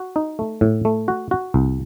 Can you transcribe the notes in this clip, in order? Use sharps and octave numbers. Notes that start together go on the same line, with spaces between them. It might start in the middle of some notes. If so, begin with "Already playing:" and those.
Already playing: F#4
D#4
A3
A2
A3
F#4
F#4
C2